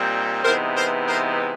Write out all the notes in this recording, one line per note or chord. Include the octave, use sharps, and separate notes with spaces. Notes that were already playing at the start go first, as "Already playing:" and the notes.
Already playing: A#2 G3 C4 D#4
C3 E3 G#3 B3 D#4 A#4 C5
A#4 C5
A#4 C5